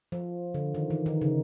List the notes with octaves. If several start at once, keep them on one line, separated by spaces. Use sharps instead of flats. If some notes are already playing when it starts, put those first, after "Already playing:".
F3
D3
D#3
E3
D#3
C#3